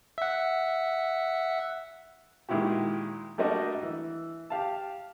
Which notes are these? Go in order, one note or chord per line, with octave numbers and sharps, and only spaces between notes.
E5 F#5
A#2 D#3 G#3 E4 F#4 G4
G3 A3 A#3 D4 F#4 D#5
E3
G4 F5 A5